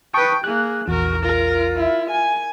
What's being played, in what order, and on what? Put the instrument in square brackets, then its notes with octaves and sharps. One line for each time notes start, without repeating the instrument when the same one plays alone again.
[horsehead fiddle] B4 G5 [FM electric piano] A5 C#6 D#6
[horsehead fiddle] A#3 G#4 [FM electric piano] F#6
[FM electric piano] A#1 E2 [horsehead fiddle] F#4 A#4
[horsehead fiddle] F4 [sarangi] A#4
[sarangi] E4
G#5